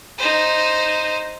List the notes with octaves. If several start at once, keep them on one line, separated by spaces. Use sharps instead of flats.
D#4 C5